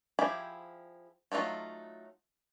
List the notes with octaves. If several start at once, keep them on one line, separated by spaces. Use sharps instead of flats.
F3 E4 G4 G#4 B5
F#3 A3 D#4 F4